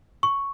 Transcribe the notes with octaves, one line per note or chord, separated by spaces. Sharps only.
C#6